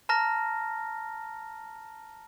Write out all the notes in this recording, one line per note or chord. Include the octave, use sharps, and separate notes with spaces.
A5 A#5 F6 A#6